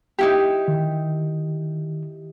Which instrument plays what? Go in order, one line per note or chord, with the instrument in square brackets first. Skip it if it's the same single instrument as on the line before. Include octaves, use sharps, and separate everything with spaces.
[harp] D#4 E4 G4
[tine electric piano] D#3